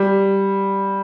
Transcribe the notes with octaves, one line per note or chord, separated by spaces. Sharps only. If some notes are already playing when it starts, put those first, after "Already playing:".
Already playing: G3